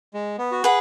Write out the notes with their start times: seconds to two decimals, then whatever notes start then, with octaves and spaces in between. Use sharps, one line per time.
0.14 G#3
0.39 B3
0.52 F#4
0.63 G#4 B4 F#5